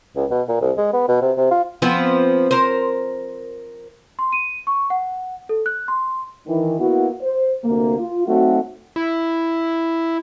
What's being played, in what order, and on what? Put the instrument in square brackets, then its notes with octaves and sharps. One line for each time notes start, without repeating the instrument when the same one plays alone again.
[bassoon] C#2
B2
A#2
C2
G#3
B3
B2
C3
C3
F4
[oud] F3 B3 C4
A#4 C5
[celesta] C6
D#7
C#6
F#5
A4
F#6
C6
[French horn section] D#3 E3
A#3 B3 E4 F#4
C5
D2 C3 A#3
F4
F#3 A3 C4 D#4 F#4
[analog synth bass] E4